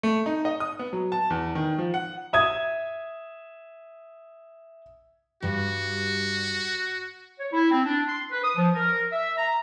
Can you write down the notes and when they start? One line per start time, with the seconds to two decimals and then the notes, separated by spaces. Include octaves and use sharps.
0.03 A3
0.26 D#4
0.45 D#5
0.60 D#6
0.79 B3
0.93 F#3
1.12 A5
1.30 E2
1.55 D#3
1.78 F3
1.94 F#5
2.33 E5 D#6 G#6
5.43 G2 G3 F#4
7.40 C#5
7.53 E4
7.71 C4
7.86 D4
8.08 C6
8.32 B4
8.44 D#6
8.57 F3
8.75 A#4
9.13 E5
9.38 A#5